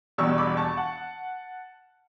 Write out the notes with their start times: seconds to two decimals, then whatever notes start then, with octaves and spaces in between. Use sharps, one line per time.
0.18 E1 E2 B2 G3 C#6 E6
0.38 B5 D6
0.57 A5 C#6
0.77 F#5 A5